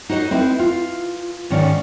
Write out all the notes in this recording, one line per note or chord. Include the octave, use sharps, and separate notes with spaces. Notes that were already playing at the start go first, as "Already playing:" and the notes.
D#4 F#4 C5 D5 D#5
C4 D#4 E4 B4
F4
G#2 D#3 C#4 D5